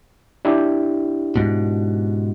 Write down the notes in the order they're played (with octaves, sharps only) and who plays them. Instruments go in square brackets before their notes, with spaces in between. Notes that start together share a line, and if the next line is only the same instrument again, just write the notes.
[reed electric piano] D4 E4 G4
[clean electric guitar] G#2 B2